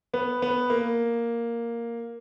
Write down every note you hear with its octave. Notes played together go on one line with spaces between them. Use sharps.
B3
B3
A#3